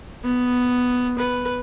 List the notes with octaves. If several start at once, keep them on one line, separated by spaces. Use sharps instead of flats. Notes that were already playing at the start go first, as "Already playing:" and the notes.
B3
B4